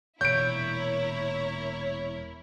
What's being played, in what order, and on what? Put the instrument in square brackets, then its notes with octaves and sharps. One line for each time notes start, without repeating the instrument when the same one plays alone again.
[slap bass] E1 A#2 [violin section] E4 A#4 [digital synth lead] C#5 [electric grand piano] G6 D7